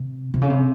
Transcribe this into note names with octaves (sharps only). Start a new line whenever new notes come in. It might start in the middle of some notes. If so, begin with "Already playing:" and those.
Already playing: C3
C3
C#3
C3